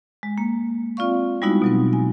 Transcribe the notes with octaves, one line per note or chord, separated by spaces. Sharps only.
G#3
A#3
C4 F4 D5 F5 C#6
G3 G#3 B3 D#4 E4 F#4
B2 F#3 C4
G#5